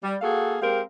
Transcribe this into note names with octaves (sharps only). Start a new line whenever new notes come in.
G3
A#3 F#4 G#4 A4 F5
G#3 C4 G4 A#4 F5